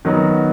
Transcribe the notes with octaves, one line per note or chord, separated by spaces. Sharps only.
D#3 F#3 B3 F#4